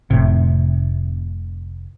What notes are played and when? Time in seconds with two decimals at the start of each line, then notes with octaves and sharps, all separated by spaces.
0.10 F1 A2 C3